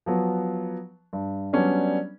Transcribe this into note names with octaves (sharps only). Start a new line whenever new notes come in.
F3 F#3 B3
G2
F#3 G3 B3 C#4 D4